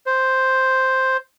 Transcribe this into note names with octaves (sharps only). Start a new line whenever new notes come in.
C5